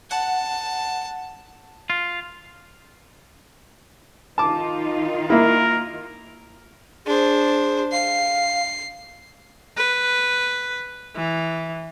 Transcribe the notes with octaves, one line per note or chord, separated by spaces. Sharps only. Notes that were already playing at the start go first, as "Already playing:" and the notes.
F#5 A5
F4
D#3 D#4 F4 A5 D6
A#3 E4 A#4
D4 G#4 C5
F5 C7
B4
E3